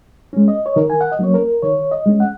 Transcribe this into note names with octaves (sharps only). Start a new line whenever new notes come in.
G#3 C#4
D#5
C#5
D#3 A#4
G#5
F#5
D#5
F#3 A#3 C#4 C#5
A#4
D#3 C#5
D#5
G#3 C#4
F#5